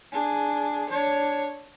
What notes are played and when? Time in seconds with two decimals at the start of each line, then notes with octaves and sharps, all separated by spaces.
0.12 D4 G#4
0.90 D4 C#5